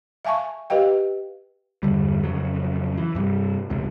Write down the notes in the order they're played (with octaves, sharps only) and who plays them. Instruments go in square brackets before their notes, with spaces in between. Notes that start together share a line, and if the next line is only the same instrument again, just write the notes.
[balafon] E5 F5 G#5 A5 C#6
G4 B4 D#5 F5 G5
[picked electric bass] E2 G2 D3 G3
F2 C#3 F#3
E3
G2 C3 G3
E1 C#2 G#2 C3